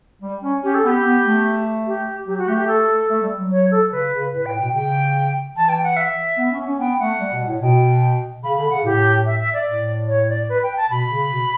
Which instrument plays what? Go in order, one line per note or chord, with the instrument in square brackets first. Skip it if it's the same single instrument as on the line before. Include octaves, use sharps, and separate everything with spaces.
[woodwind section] G3
C#4
[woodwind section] C#4 [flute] G4
[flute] A4
[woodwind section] B3 [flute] G4
[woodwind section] B3
A3
[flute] G4
[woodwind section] F#3 [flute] G4
[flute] F#4
[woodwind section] A3 [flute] G4
[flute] G4
A4
[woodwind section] A3
G3
F#3
[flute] C#5
A4
[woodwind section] C#3 [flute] B4
[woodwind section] C#3
[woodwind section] A2 [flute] B4
[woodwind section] A2 [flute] G5
[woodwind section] B2 [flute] G5
[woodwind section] C#3 [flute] G5
[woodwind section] E3 [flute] A5
[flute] G5
F#5
E5
[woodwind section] B3
C#4
C#4
[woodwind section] B3 [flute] G5
[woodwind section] A3 [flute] F#5
[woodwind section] G3
B2
A2
[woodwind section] B2 [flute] G5
[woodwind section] C#3 [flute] B5
[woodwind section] D3 [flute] B5
[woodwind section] C#3 [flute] F#5
[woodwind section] A2 [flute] G4
[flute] E5
E5
D5
[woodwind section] A2
[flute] C#5
D5
B4
G5
A5
[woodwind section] B2 [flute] B5
[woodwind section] C#3
B2